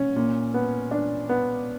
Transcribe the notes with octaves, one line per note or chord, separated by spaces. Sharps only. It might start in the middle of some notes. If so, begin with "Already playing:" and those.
Already playing: C#4
A#2
B3
D4
B3